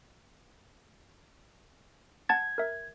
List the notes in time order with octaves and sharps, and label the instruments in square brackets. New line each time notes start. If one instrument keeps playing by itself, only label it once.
[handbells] F#5 A5 A6 [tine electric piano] G#6
[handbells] A#4 E5